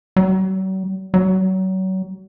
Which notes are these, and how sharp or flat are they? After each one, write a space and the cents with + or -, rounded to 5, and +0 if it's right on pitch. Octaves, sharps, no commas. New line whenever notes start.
F#3 +45
F#3 +30